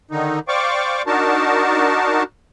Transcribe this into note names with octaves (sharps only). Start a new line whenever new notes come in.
D3 D#3 D#4
C5 D5 F5 G5 C#6 D6
D4 D#4 F#4 A#4 A5